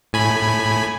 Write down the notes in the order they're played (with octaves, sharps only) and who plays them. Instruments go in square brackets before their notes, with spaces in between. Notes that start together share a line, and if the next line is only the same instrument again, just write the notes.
[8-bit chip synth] A2 G#5 B5